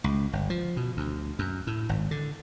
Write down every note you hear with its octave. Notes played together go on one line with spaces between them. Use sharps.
C#2
G1
F3
B2
D2
F#2
A2
G#1
D3